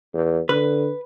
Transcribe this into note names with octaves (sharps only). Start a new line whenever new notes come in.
E2
D3 B4